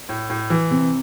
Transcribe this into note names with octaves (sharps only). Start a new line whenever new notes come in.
A2
A2
E3
C3